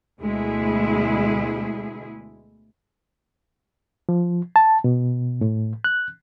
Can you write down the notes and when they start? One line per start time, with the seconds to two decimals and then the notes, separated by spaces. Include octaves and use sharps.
0.21 D2 B2 G#3 E4 G#4
4.09 F3
4.56 A5
4.84 B2
5.41 A2
5.84 F#6